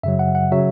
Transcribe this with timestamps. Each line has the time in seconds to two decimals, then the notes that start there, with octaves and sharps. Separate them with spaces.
0.03 F#2 C#3 F#3 E5
0.19 F#5
0.35 F#5
0.52 C#3 F#3 E5